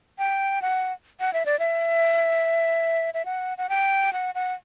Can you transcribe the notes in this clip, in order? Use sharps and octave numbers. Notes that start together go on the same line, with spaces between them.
G5
F#5
F#5
E5
D5
E5
E5
F#5
F#5
G5
F#5
F#5